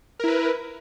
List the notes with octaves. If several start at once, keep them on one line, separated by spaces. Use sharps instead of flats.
E4 A#4 B4